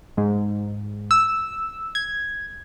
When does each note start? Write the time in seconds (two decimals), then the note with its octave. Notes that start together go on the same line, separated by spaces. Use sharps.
0.17 G#2
1.11 E6
1.95 G#6